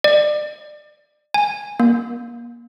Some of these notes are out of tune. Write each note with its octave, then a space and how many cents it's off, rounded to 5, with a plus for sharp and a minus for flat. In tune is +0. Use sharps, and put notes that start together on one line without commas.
D5 +30
G#5 -10
A#3 +30